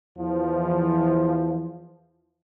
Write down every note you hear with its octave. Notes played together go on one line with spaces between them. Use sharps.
E2 E3 F3